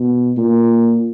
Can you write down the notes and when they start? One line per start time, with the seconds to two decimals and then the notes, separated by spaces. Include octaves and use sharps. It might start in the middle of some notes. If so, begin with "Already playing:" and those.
Already playing: B2
0.38 A#2